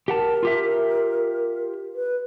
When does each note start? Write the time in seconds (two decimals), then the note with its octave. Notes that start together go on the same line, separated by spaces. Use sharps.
0.08 G4 A#4 F#5 A5
0.43 F4 G4 E5
1.95 B4